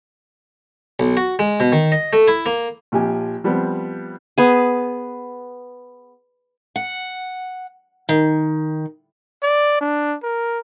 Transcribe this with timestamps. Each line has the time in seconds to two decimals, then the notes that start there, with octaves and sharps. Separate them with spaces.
1.00 B1
1.17 F#4
1.39 G#3
1.60 B2
1.72 D#3
1.92 D#5
2.13 A3
2.28 E4
2.46 A#3
2.92 A#1 F3 G4 G#5
3.44 F3 G3 B3 C4
4.38 B3 G#4
6.76 F#5
8.09 D#3
9.43 D5
9.81 D4
10.23 A#4